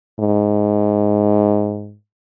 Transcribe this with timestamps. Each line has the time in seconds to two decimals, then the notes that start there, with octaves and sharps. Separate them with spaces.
0.20 G#2